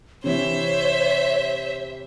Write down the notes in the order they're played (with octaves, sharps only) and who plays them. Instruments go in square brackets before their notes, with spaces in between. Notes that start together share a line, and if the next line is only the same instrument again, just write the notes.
[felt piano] C3 E3 [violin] C5 E5 [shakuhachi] C#5